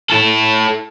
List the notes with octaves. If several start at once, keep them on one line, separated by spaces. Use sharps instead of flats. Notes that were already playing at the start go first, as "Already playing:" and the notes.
E4 A4